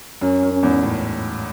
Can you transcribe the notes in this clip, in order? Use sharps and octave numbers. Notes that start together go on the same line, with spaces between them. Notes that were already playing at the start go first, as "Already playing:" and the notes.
F#2 C#4
F#2
C#4
E2 G#2
A2